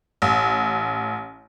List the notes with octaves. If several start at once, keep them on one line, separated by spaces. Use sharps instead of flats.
A1